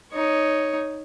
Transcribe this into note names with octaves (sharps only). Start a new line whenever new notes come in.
D#4 C#5